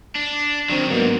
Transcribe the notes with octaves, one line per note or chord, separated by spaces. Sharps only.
D4
D#3 F#3 C4 D4
G#2 F#3 A#3 B3